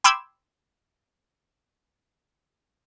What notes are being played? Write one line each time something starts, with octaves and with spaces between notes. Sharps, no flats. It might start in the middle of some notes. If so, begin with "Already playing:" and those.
G5 B5 C6 D6 E6 G#6